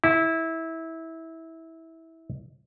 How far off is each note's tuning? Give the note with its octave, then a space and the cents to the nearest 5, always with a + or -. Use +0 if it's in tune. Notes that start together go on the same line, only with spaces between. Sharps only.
E4 -20